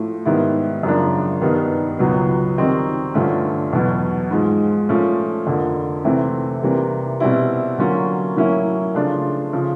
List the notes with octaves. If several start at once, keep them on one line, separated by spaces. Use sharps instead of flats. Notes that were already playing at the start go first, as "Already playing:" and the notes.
Already playing: A2 F3 A3
G#2 D#3 G3 B3 E4
F#2 C#3 F3 A#3 D4
G2 D#3 G3 B3 D#4
C#2 B2 F#3 B3
D#3 G3 C4 D#4 F#4
G2 D3 F3 A3 C#4
E2 B2 F#3
G#2 F3 G#3
A#2 F3 A3 C#4
F2 D3 F3 A#3
C3 E3 A3 C4 E4
C3 E3 G3 A#3
B2 G3 C4 E4
D3 F#3 A#3 C#4 F4
A2 F#3 A#3 C#4 E4
C#3 F3 A3 D4 F4
C#3 F3